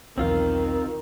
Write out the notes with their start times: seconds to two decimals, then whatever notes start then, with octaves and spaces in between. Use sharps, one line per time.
0.18 B1 E2 D#3 C4 F4 F5